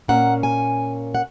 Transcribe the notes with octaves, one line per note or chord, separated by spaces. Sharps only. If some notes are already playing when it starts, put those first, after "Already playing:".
A#2 A#3 C#4 F#5
G#5
F#5